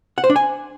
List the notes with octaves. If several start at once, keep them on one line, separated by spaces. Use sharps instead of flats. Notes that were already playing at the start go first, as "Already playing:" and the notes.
F#5
C5
D4
G#5